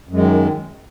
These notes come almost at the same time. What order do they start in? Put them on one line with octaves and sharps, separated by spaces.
F#2 G#3 D#3